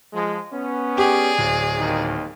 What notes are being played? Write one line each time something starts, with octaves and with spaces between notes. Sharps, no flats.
F3 G#3
B3 C#4
G4 G#4 D5
D1
D#2 D#3